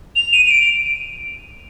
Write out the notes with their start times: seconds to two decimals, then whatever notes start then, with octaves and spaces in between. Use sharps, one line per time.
0.16 F7
0.33 D#7
0.45 D#7
0.50 D7